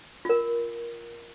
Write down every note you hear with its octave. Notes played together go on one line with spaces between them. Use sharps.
F4 A#4